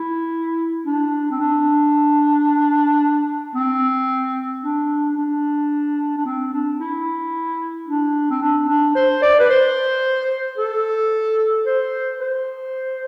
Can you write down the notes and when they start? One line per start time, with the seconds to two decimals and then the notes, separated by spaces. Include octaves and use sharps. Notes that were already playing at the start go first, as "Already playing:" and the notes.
Already playing: E4
0.86 D4
1.31 C4
1.40 D4
3.55 C4
4.64 D4
5.17 D4
6.17 D4
6.25 C4
6.53 D4
6.80 E4
7.88 D4
8.30 C4
8.41 D4
8.68 D4
8.95 C5
9.22 D5
9.39 B4
9.49 C5
10.58 A4
11.66 C5
12.20 C5